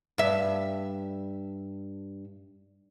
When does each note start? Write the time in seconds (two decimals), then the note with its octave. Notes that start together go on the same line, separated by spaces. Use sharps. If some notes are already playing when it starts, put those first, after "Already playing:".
0.18 G2 E5